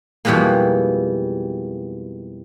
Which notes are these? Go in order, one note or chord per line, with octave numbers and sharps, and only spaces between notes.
F2 B2 E3 G3 G#3 A#3